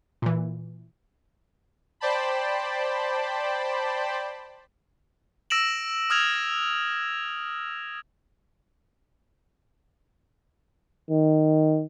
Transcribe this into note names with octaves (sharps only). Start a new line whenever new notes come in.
A#2 E3
C5 D5 G5 A5 B5
E6 A#6 D7 E7 F#7
D#6 F6 G#6 F7
D#3